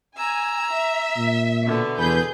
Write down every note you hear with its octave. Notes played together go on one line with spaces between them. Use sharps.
G#5 A#5 E6
E5
A#2
B2 D3 B3
E2 G#4 B4 G6